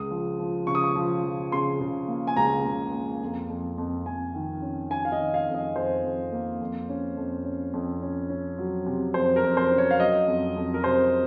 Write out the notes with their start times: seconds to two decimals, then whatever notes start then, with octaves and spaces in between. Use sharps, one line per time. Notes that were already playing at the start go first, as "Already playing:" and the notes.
Already playing: C#2 D#6
0.11 F3
0.39 F3
0.67 C#3 C#6
0.75 D#6
0.84 C#6
0.96 F3
1.24 F3
1.52 C#3 C6
1.80 C#3
2.08 A#3
2.27 G#5
2.36 C#2 A#5
2.65 C#2
2.93 A#3
3.22 F2
3.49 F2
3.78 F2
4.06 F2 G#5
4.35 D#3
4.62 C#4
4.91 C#4 G#5
5.05 F5
5.12 D#5
5.19 D#3
5.34 F5
5.48 F2
5.54 D#5
5.75 F2 C5
6.04 F2
6.32 A#3
6.60 F2
6.89 C#4
7.17 F2
7.45 C#4
7.73 F2
8.02 C#4
8.30 C#4
8.58 F#3
8.86 C3
9.14 F2 C5
9.36 A#4
9.43 F2
9.57 C5
9.71 C#4
9.78 C#5
9.91 F5
10.00 F#3 D#5
10.28 F2
10.56 F2
10.74 A#4
10.84 C3 C5